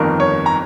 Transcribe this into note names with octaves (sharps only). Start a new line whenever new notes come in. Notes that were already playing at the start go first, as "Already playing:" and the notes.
Already playing: G1 F2 D#3 A#4
C#5
A#5